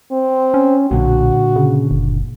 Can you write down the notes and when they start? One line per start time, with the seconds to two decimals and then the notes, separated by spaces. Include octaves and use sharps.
0.12 C4
0.54 C#4
0.91 B1 A#2 D3 F#4
1.56 C#3
1.91 F#1